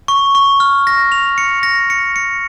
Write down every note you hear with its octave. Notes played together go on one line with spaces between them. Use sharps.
C#6
C#6
F6
A#6
F7
C#7
A#6
C#7
C#7